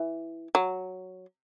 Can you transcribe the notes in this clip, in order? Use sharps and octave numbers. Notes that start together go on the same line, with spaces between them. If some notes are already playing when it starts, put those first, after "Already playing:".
Already playing: E3
F#3